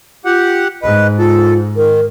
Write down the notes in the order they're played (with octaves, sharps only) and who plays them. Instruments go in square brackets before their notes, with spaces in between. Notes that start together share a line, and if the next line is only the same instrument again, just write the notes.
[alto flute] F4 [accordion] G4 F#5
[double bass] G#2 [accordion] B4 [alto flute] D#5
[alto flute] F4 [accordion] A4
[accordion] D#3 [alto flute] A#4